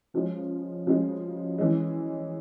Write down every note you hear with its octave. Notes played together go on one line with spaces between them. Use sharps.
C#3 F3 G#3 C#4
C#3 F3 G#3 C#4
E3 G#3 C#4